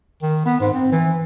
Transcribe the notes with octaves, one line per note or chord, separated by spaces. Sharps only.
D#3
B3
G#2
C4
E3